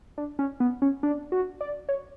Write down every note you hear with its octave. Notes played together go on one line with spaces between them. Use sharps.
D4
C#4
B3
C#4
D4
F#4
D5
C#5